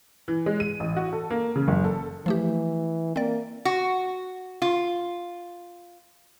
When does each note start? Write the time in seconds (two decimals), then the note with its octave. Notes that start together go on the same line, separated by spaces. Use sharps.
0.28 E3
0.46 G#3
0.60 D#7
0.80 A1
0.97 F#4
1.13 A4
1.31 A#3
1.56 C#3
1.68 F#1
1.84 A4
2.26 E3 F3 A3 G4
3.16 A#3 C4 D5
3.65 F#4
4.62 F4